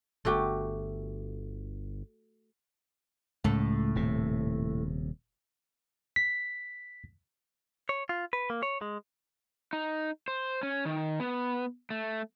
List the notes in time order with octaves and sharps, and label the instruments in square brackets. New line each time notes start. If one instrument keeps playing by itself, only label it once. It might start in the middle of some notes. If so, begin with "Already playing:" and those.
[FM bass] G1 [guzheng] A3 F#4 G4
[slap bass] C#2 [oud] A2 A4
[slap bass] D#1 C3
[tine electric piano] B6
[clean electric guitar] C#5
F4
B4
A#3
C#5
G#3
[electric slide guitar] D#4
C5
C#4
D#3
B3
A3